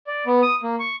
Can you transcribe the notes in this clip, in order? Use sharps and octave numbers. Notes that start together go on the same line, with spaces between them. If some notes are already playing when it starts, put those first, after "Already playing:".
D5
B3
D#6
A#3
C#6